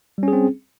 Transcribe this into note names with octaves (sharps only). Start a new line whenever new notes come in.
G3 C4 C#4 G#4